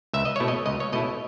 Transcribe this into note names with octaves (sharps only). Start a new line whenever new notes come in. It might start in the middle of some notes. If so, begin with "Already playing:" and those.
C#2 E5
D#5
B2 A3 E4 C#5
D#5
C#2 D#5
C#5
B2 A3 E4 D#5